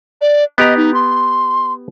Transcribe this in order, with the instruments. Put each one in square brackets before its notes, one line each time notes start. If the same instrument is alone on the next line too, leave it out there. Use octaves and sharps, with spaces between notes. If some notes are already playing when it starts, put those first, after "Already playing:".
[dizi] D5
[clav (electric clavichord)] B3 G4 A#5 [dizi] D#5
[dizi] D#4
C6